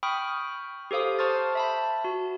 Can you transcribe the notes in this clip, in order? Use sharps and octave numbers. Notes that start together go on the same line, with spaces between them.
G5 B5 C#6 D#6 F6
G4 A4 C5 F5 D#6
C5 A5 C6 C#6 F6 A6
E5 A5 B5
F#4